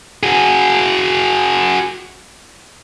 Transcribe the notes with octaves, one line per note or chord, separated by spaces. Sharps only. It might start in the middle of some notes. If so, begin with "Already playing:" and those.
F#4 G#4